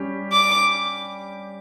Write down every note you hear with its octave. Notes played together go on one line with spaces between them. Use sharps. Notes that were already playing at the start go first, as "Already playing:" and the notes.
Already playing: G3 C#4 G4
D6